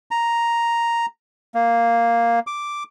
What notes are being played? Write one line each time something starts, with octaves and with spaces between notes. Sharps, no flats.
A#5
A#3
D6